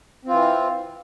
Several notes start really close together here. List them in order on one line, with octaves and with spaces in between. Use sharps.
C4 F4 E3